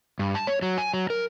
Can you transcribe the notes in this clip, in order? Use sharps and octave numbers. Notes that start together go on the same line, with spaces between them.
G2
A5
C#5
F#3
G#5
F#3
A#4